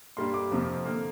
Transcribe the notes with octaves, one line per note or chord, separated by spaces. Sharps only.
G2 G3 A#3 C6
D6
F2 C3 F3 A#3
D3 A#3